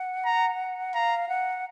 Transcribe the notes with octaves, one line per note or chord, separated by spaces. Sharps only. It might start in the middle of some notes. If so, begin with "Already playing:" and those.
Already playing: F#5
A#5
F5 A#5
F#5